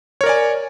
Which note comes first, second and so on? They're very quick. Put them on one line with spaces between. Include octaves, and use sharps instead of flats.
C#5 A#4 D5 G#5